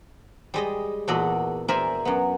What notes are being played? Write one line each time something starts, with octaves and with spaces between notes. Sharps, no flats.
G3 G#3 D#5
E2 A#2 F#4 A4 D5 D#5
A#4 C5 D5 E5 G#5
F#2 B3